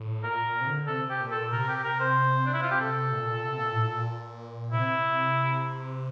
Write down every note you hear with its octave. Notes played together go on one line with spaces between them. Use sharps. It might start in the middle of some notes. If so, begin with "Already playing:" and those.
Already playing: A2
A#2 A#4
A#2
C3
D3
C3 A4
G4
A#2
A4
C3 A#4
G4
A#4
C5
D4
E4
F4
G4
C3 A4
A#2
C3
A#2
A2
A#2
C3 E4